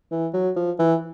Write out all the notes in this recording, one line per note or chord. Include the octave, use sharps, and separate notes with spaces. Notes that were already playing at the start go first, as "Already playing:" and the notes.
E3
F#3
F3
E3